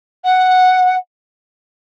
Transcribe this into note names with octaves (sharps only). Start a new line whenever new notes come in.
F#5